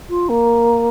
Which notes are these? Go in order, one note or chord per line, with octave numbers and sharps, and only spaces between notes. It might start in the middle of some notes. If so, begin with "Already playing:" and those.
F4
A#3